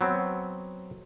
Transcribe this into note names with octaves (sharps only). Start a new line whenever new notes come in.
F#3 B3 C4